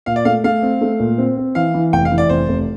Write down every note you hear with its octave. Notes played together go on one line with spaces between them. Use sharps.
A#2 F5
D5
A3 F5
A3 F5
C4
A3
A#2
C4
C4
E3 F5
E3
F1 G5
F5
E3
D5
F1 C5
F1